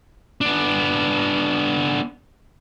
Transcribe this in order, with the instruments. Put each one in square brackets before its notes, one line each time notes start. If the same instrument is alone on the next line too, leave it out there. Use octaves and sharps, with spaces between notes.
[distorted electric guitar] B3 D4